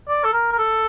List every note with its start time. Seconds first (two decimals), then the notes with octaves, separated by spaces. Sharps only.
0.08 D5
0.24 A4
0.33 A#4
0.52 A#4
0.59 A4